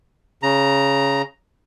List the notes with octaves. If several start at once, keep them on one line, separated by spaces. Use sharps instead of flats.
C#3 A#5